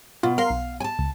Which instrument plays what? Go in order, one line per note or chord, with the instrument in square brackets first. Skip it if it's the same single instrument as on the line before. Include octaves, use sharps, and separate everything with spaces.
[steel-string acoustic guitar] B2 [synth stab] F4
[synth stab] A#4 C6 [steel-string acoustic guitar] F5
[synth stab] B1
[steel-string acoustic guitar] G#5 A5
[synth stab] C#2